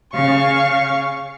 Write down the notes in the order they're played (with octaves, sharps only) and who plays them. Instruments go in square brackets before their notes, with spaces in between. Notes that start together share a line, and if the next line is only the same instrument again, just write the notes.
[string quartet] C#3 F5 C#6